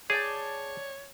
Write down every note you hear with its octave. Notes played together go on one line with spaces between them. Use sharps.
G#4 C#5 D5 G5 A5